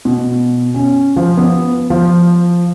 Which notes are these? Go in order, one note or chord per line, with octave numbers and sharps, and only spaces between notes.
B2
C#4
F3
B3
F3